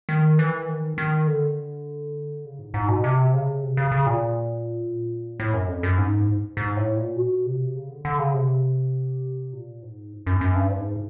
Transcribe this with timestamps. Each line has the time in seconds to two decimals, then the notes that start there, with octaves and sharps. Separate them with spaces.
0.09 D#3
0.39 E3
0.68 D#3
0.98 D#3
1.27 D3
2.45 C#3
2.59 G#2
2.74 G#2
2.88 B2
3.04 C3
3.34 C#3
3.63 C3
3.77 C#3
3.92 C#3
4.06 A#2
5.40 A2
5.54 F#2
5.69 F2
5.83 F#2
5.98 G#2
6.57 G#2
6.77 A2
6.97 A#2
7.16 B2
7.46 C3
7.75 C#3
7.90 D3
8.05 D3
8.19 C#3
8.34 C3
9.53 A#2
9.82 G#2
10.27 F#2
10.41 F#2
10.55 G2
10.71 G#2